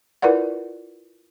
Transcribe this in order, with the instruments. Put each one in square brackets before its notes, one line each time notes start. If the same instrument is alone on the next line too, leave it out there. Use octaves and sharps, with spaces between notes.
[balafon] E4 F4 A#4 B4 D5 F#5